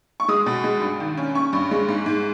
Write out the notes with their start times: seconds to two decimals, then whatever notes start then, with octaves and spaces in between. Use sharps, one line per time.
0.20 C#6
0.28 G#3 D#6
0.46 B2
0.64 G#3
0.81 G2
1.00 D#3
1.17 C#4
1.35 C#4 C#6
1.53 G2
1.71 G#3
1.88 G#2
2.06 G#2